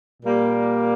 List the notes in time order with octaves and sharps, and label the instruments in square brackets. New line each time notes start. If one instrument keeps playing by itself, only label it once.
[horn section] A#2 G3 A#3